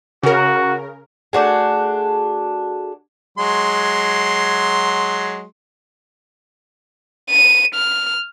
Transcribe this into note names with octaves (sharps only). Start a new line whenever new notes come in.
C#3 F#4 A#4
A3 D4 F#4 G#4
F#3 G#3 C6
D#7
F6